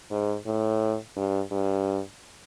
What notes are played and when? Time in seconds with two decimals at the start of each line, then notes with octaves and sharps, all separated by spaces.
0.11 G#2
0.46 A2
1.16 G2
1.51 G2